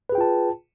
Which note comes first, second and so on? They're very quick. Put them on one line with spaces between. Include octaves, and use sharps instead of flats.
B4 G#4 G5 F4 A5